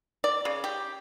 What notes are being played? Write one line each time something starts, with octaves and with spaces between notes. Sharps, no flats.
D5
C#3
G4